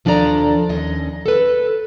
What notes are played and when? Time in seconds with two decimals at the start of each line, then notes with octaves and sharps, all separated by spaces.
0.05 D#2 F3 D4 A4 D5 A#5
0.69 D#2 C#4 D#5
1.26 A4 B4